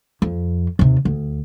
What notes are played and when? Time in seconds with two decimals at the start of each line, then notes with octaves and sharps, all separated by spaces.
0.22 F2
0.79 D#2 C3
1.05 D2